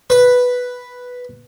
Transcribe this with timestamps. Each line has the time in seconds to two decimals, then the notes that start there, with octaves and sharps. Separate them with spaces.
0.10 B4